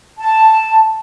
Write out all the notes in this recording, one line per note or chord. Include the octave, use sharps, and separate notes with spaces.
A5